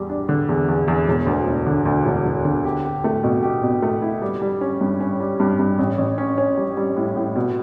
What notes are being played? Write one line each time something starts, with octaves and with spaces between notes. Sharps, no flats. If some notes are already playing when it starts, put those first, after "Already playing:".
Already playing: E2 G3
D4
D3
E2
E2
E2
E1
D2
E1
D3
D2
E1
E1
D3
G4
G4
A3
B2
G4
B2
A3
E4
G3
G3
C#4
G2
C#4
G3
G2
G2
A1
A1
C#4
C#4
G3
G3
A2
A2
B2